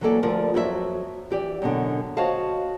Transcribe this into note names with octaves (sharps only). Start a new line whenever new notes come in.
E3 F#3 A#3 E4 A4 D5
D2 F3 G3 F4 A#4 D5
F2 F#3 A4 E5
E3 G4 D5
F#2 B2 D3
F#4 C5 C#5 D#5 F5 A5